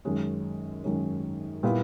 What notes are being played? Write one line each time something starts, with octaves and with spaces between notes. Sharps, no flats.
F#2 D#3 G#3 C#4
F#2 D#3 G#3 C#4
A#2 G3 B3 E4